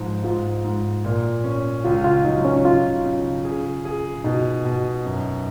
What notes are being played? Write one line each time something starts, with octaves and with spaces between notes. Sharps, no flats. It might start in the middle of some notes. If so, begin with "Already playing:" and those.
Already playing: G#2 F3
G#2 F4
G#2
A#2
C#4
C#2 F4
F4
F#3 D#4
C#4
C#3 F4
C#3
G#4
G#4
B2 D#4
B2
F#2